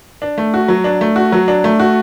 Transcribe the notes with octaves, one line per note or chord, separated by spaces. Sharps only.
D4
A3
F#4
F#3
D4
A3
F#4
F#3
D4
A3
F#4